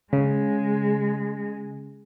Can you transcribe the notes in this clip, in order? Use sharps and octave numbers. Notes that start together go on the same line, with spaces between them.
C#3 G#3